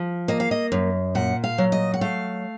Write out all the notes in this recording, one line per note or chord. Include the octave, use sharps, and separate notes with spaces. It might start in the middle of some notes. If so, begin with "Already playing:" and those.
Already playing: F3
A#3 D#5
F5
D#5
F#2
A#2 F#5
F5
F#3
D#5
F#5
A3 F5